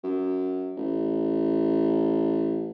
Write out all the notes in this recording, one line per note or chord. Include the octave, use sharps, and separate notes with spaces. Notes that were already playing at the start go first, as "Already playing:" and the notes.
F#2
A1